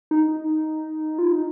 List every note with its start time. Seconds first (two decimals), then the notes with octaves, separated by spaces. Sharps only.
0.11 D#4
1.19 F4
1.32 D#4